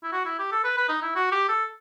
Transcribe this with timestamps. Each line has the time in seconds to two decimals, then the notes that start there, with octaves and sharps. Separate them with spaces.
0.04 E4
0.13 F#4
0.26 E4
0.39 G4
0.52 A4
0.64 B4
0.77 B4
0.89 D#4
1.02 E4
1.15 F#4
1.32 G4
1.49 A4